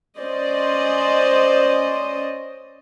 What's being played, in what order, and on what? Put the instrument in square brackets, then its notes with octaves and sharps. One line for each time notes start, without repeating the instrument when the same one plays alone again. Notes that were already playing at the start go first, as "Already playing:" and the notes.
[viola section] C#4 C5 D5 D#5